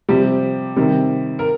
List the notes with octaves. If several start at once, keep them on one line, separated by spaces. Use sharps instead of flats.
C3 F3 G3 G4
C3 D#3 G3
A#4